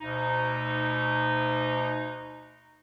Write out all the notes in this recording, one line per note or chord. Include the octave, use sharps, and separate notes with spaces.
D2 B2 D#4